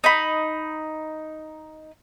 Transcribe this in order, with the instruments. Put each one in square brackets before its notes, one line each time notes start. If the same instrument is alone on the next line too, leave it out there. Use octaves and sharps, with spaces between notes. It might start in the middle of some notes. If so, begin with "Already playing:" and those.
[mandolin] D#4 B5